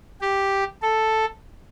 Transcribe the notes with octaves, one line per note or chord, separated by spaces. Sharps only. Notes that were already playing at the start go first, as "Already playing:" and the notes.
G4
A4